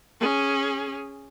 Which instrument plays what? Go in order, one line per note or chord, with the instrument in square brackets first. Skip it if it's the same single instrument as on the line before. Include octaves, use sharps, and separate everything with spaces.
[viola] C#4 G#4